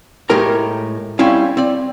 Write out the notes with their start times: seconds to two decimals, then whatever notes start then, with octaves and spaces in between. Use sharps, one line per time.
0.30 A2 G#3 A3 G4 A#4 A#5
1.19 G3 C4 C#4 E4 F5
1.57 C4 D5